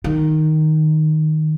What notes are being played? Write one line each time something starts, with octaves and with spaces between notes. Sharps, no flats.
D#3